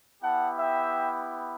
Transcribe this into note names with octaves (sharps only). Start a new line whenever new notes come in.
B3 E4 G4 F#5 A5
E5 G5